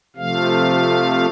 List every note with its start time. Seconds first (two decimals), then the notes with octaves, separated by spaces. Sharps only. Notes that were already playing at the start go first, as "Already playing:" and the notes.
0.16 C3 F3 A3 F5